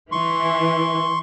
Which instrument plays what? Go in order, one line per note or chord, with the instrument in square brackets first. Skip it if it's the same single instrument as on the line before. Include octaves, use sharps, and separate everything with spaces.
[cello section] E3 [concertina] C6 C#6